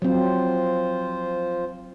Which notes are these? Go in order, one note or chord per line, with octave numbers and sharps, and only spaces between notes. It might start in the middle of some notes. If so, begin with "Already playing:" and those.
F3 F#3 C4 F4 C5